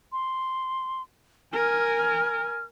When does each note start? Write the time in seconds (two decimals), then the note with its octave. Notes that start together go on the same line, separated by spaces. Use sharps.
0.12 C6
1.54 A#4 G#5 F6